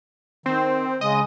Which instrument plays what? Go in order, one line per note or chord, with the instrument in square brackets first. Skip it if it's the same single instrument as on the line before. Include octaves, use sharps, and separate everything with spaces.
[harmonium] D#3 [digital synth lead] C4
[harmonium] C#3 G#3 [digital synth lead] D#5